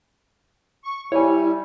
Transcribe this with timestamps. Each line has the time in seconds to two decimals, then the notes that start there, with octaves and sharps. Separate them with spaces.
0.84 C#6
1.12 G3 E4 C#5 G#5